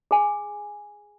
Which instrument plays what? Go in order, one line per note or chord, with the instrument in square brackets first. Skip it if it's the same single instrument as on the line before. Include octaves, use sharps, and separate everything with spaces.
[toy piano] G#4 G#5